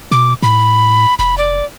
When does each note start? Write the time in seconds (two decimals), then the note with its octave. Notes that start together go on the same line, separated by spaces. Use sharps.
0.11 B2 D6
0.42 A2 B5
1.19 F1 B5
1.38 D5